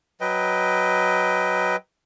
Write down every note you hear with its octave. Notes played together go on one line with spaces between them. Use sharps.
F#3 B4 D#5 G5